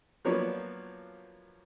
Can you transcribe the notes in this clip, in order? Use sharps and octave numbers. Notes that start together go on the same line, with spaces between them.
F3 F#3 A#3 B3 D4 C#5